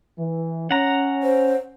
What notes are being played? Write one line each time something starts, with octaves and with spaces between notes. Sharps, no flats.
E3
C#4 F#5 A#5
C5